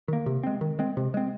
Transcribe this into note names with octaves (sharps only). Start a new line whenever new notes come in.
D#3 A#3
C3
G#3 C4
D#3
G#3 C4
C3
G#3 C4